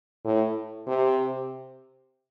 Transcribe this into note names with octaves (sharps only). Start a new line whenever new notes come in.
A2
C3